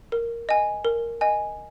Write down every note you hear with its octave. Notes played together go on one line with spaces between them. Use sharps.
A#4
D#5 G#5
A#4
D#5 G#5